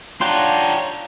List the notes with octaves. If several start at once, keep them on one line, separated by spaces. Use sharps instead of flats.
D4 F4 G4 C#5 F#5 G5 A#5 C6